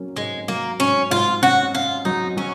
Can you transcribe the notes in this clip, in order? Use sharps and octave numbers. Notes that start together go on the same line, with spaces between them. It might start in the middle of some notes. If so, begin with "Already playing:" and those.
Already playing: F#3 A#3 C#4
G#2 G#3
F#3 A#3
G#2 C#4
G#2 F4
C#4 F#4
C#4 F4
F#3 D#4
F#3 C#4